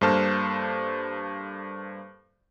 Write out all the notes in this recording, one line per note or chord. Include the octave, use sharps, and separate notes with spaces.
G2 A#3 A4 C5 A5 F6